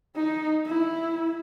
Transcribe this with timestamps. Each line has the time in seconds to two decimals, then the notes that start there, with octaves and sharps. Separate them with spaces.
0.16 D#4
0.66 E4